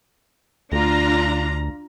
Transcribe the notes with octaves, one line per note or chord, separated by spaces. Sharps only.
D2 D4 F4 A#5